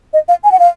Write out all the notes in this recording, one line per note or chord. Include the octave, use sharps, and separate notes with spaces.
D#5
F5
G#5
F#5
F5